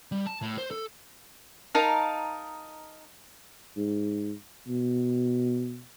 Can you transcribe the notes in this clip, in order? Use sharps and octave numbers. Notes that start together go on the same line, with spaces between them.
G3
A5
A2
C5
A4
D#4 A#4 F5 A5
G#2
B2